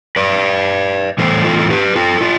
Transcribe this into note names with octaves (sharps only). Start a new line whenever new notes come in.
B4 D5
A2 E3 G3 A4 C5
F4 A4
A4
G4 B4
F4 A4
D4 F4